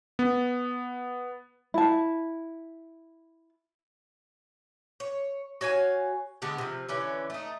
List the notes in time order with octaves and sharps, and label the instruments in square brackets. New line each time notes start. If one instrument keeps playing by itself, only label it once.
[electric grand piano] B3
[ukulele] E4 A5
[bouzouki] C#5
F#4 C#5 F5 G#5
D3 G#3 B3 G4
C3 F3
D3 E3 C#4
A3 D#4